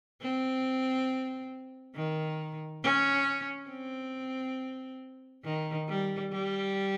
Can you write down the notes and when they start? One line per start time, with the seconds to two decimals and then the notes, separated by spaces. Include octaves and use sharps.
0.21 C4
1.96 D#3
2.83 C#4
3.70 C4
5.44 D#3
5.89 G3
6.32 G3